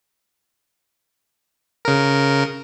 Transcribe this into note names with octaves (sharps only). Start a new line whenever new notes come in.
C#3 A#4